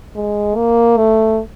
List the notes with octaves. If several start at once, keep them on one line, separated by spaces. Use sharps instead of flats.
G#3
A#3
A3